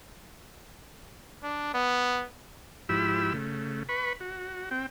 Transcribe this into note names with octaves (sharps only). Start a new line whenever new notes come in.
D4
B3
G#2 F3 E4 G4 B5 E6
C#3 A3
B4 B5 C#6
F#4
C4 G5